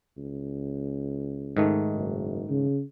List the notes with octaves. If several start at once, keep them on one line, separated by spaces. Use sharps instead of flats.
C#2
G#2 D#3 A3
F#1
C#3